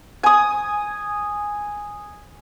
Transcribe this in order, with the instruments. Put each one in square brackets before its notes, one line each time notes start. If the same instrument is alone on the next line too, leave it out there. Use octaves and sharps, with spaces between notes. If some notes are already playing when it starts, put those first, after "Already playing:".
[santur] G#5 D#6